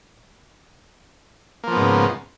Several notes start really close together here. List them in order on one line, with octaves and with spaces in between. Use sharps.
A#3 F3 B3 G#2 C#3